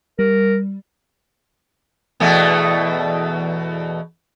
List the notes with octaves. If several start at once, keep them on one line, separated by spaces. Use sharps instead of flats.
G3 A#4
E2 B2 A3